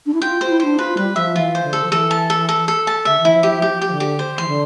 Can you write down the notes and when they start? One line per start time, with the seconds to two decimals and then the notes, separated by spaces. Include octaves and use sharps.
0.06 D4
0.14 E4
0.22 F4 G5
0.41 F4 C5
0.50 E4
0.60 D4 C5
0.79 F4 B4
0.97 G3 B4
1.16 F3 E5
1.36 E3 F4
1.55 C5
1.63 D3
1.73 A4
1.84 F3
1.92 E3 A4
2.11 A5
2.30 A4
2.49 A4
2.68 A4
2.87 A5
3.05 D3 E5
3.20 E3 E4
3.34 F3
3.43 G4
3.49 F3
3.62 F3 G4
3.81 G4
3.91 D3
4.00 G4
4.19 C5
4.37 E3 C6
4.48 D3